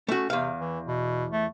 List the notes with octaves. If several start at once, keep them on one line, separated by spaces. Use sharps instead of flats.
A3 C#4 F#4
E2 C3 F5
E3
B2
A3